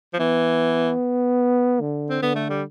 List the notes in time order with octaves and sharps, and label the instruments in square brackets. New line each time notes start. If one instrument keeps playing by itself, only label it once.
[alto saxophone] F3
[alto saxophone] E3 [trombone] B3
[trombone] D3
[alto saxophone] C4
[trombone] D3 [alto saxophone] B3
[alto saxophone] A3
G3